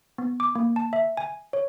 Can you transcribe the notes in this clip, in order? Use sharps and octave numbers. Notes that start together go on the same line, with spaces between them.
B3
D6
A#3
A5
E5
G#5
C#5